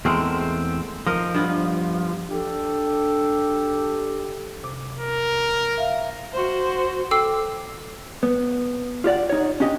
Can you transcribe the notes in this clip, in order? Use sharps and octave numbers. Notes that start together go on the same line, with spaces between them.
E2 G#3 A3 C4 A#4
F3 D#4 A#4 D#5
G2 B3
D4 G4 A4
C3 D6
A#4
E5 F5
F#4 C5
A4 G5 D6 E6 C7
B3
F4 G4 D5 F#5
D#4 C#5
C#4 D4 G4 D#5